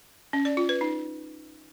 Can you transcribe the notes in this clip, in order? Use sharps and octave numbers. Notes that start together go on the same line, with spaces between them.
C#4
D5
F4
B4
D#4